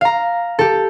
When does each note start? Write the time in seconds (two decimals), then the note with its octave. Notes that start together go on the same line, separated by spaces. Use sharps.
0.01 F5 A#5
0.59 G4 A4